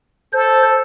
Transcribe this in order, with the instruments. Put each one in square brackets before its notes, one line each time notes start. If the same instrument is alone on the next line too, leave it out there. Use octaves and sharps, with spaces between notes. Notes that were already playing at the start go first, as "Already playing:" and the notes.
[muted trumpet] A4 [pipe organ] C5